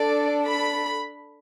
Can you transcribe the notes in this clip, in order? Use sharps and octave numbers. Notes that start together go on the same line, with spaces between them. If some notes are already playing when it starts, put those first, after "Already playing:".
Already playing: D4 A4 D5
B5